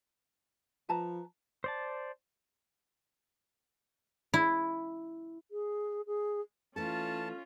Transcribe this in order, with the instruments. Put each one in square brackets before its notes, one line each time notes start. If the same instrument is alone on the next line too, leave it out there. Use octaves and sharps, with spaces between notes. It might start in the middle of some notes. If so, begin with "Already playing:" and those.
[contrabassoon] F3 [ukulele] B4 A5 A#5
[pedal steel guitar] C5 D5 A5
[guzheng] E4
[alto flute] G#4
G#4
[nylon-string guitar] E3 A3 A4 [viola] C#4 F4 [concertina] A5